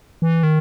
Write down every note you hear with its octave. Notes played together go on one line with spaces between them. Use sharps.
E3
D#3